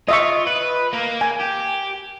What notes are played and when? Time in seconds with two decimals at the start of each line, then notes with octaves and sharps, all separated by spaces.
0.08 F4 D#5 E5 C#6
0.47 B4
0.93 A#3 A#4
1.21 G#5
1.40 G4